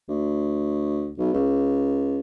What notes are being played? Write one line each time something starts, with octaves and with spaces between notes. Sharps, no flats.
D2
B1
C#2